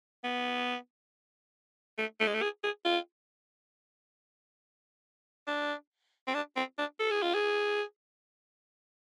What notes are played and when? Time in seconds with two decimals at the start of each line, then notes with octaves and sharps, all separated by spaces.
0.24 B3
1.98 A3
2.20 A3
2.27 G#3
2.34 A3
2.42 G#4
2.64 G#4
2.85 F4
5.47 D4
6.27 C4
6.34 D4
6.56 C4
6.78 D4
6.99 A4
7.11 G#4
7.22 F4
7.34 G#4